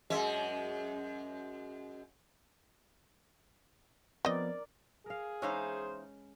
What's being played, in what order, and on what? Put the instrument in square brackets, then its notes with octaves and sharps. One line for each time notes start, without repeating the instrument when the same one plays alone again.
[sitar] F#2 G#3 E5
[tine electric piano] F3 B3 B4 [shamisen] C4 D#5 [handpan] A#4 D5
[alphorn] G#4 [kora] A#4 F5
[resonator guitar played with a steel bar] E2 D#4 F5 [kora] G#3 C#4 B4 [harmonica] C5